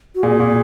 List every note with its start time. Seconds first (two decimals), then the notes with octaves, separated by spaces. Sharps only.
0.15 F#4
0.23 A#2 G#4
0.40 A#2